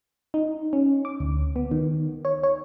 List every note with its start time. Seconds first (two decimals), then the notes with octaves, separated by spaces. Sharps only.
0.34 D#4
0.73 C#4
1.05 D6
1.20 D2
1.56 B3
1.71 D#3
2.25 C#5
2.43 C#5